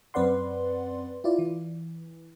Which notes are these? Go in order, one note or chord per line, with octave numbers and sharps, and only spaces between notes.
F#2 C4 B4 D5 F#5 C6
E4 F4 D5
E3